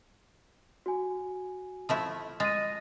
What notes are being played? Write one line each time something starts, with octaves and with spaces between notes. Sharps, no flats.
F#4 G#5
F3 A3 E4
G#3 A6 A#6 D#7